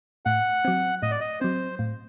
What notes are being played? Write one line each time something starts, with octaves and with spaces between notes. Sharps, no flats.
A2 F#5
F#3 C4
A2 D#5
D5
D#5
F#3 C4 C5
A2